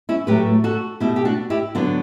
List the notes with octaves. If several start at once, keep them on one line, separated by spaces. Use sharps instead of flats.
C#4 E4
A2 F#3 A3 G4 B4
F#4 A4
B2 A3 E4 G4
G4
D4 F#4
E4 G4
D3 F#3 B3 D4 F#4